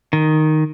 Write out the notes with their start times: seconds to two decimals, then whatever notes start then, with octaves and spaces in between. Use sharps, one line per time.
0.13 D#3